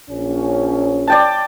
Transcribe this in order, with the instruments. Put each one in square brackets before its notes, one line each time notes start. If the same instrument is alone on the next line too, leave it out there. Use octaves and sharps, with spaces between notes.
[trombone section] A#1 C#4
[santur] D5 G5 A5